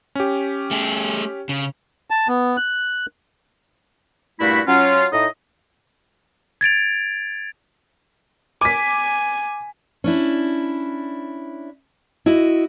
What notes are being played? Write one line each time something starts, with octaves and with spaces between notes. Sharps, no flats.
C#4 G4
A3 G#4
C#3
A5
B3
F#6
G2 A#2 A3 E4 F#4 B5
F#3 C#4 F4
A2 D#4 D#5
G#6 A6 D7 F7
G#5 D6 B6
C#4 D4 E4
E4 F#4 D#5